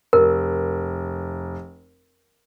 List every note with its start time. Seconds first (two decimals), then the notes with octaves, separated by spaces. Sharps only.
0.13 F1 A#4